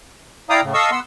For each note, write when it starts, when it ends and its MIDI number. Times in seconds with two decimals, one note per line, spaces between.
0.50 0.61 64
0.50 0.61 74
0.50 0.61 77
0.50 0.61 79
0.50 0.61 82
0.50 0.61 87
0.62 0.73 45
0.62 0.73 49
0.74 0.90 69
0.74 0.90 75
0.74 0.90 77
0.74 0.90 85
0.74 0.90 87
0.74 0.90 88
0.92 1.00 59
0.92 1.00 78
0.92 1.00 84
0.92 1.00 88